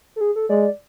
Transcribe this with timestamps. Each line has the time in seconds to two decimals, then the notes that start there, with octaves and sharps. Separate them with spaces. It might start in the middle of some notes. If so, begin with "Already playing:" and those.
0.16 A4
0.21 G#4
0.36 A4
0.49 G#3 D5